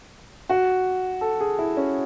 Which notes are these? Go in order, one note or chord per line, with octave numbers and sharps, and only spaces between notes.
F#4
A4
G#4
E4
C#4